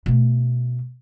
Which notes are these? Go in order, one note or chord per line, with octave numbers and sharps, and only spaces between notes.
B2 A3